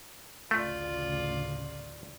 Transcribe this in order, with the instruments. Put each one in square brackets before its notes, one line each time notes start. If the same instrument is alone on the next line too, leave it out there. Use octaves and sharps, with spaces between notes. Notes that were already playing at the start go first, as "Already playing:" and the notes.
[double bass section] A1 D2 C#3 [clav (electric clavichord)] A3 [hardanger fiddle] F4 D5